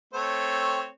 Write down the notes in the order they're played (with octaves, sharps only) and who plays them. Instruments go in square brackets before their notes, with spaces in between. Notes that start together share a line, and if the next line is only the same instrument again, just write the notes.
[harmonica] A3 C4 C#5